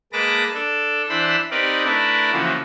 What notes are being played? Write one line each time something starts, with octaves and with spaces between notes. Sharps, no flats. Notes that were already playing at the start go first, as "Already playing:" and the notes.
G#3 A#3 B4 A5 D6 A#6
D4 A4
E3 D4 C5 B5 E6
C4 D#4 G4 A#4 B4 D5
A3 D4 E4 A#4 B4
C#3 E3 F3 A#3 F#4